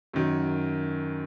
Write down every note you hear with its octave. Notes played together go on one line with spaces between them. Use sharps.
F#2 D#3 F#3